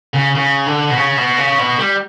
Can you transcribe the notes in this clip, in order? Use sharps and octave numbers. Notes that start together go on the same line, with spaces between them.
C#3
C#3
D3
B2
C#3
B2
C#3
B2
G3